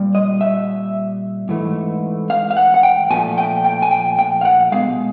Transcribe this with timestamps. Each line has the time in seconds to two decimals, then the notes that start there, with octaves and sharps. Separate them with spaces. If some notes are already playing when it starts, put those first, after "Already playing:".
Already playing: A#2 G3
0.15 D#5
0.41 E5
1.49 G#2 E3 A3
2.30 F5
2.51 F5
2.57 F#5
2.74 F#5
2.83 G5
3.11 A#2 F3 A3 G#5
3.38 G5
3.64 G5
3.82 G#5
3.91 G5
4.19 G5
4.41 F5
4.45 F#5
4.72 B2 G#3 F5